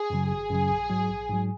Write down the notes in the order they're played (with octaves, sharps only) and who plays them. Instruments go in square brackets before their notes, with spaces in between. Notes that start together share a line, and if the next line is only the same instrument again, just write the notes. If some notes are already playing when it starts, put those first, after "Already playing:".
Already playing: [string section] G#4
[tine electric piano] F#2 C#3 F#3
[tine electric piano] G#1 [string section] G#4
[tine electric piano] F#2 C#3 F#3
A#1
G#2 F#3
A#1
G#2 F#3